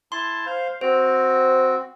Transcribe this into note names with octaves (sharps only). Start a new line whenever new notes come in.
E4 A5 C6
C5 F5
C4 F#4 C5